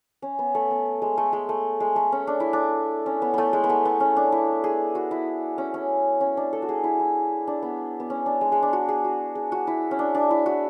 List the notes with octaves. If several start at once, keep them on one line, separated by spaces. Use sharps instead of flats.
C#4
B3
A3
B3
G#3
A3
G#3
A3
G#3
A3
C#4
D4
E4
D4
C#4
B3
A3 B3
G#3
B3
A3
B3
C#4
D4
E4
G#4
F#4
E4
C#4
C#4
C#4
D4
A4
F#4
G#4
E4
E4
D4
B3
B3
C#4
D4
G#3
G#3
D4
F#4
G#4
F#4
G#4
F#4
E4
C#4
D4
D4
E4
F#4